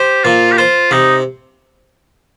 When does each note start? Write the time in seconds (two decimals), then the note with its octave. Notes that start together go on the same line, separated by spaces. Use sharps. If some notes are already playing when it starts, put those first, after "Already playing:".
Already playing: G4 C5
0.24 A#2 F4
0.52 G4
0.58 F4 C5
0.91 C3 D#4